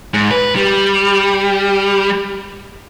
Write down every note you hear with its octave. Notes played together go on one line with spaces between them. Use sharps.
G#2
B4
G3